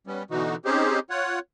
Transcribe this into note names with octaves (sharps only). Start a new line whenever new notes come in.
G3 B3 C#4
B2 D3 E3 D#4 F#4
C4 C#4 D#4 G4 G#4 C5
F4 C#5 F#5